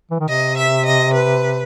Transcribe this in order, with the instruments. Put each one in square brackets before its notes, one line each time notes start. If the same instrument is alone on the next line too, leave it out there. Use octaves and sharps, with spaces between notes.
[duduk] E3
D#3
[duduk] C3 [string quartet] D#5
[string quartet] E5
D#5
B4